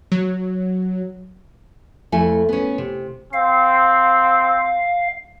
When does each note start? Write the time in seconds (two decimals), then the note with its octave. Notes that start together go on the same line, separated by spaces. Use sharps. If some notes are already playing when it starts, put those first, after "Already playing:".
0.12 F#3
2.12 F2 A3 E4 G#5
2.49 B3 C#4
2.78 C3
3.33 C4 F5